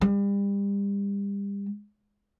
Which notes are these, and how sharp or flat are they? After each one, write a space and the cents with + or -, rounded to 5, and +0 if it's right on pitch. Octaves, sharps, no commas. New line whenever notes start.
G3 +35